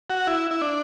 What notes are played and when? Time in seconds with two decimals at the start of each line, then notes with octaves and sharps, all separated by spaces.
0.10 F#4
0.27 E4
0.51 E4
0.61 D4